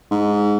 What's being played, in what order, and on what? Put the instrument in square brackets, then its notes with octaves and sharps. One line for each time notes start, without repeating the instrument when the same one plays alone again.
[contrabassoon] G#2